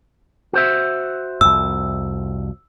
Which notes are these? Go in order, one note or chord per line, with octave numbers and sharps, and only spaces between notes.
F#4 C5 E5
C2 F2 E6